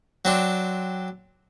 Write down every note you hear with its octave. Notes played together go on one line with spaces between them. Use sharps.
F#3 C4 D4